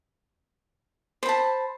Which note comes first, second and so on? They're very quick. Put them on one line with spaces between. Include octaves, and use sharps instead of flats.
C5 B5 A5